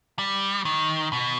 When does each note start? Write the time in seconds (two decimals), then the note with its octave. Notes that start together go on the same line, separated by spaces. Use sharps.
0.19 G3
0.65 D#3
1.13 B2